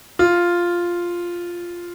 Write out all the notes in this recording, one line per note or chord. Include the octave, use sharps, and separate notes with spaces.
F4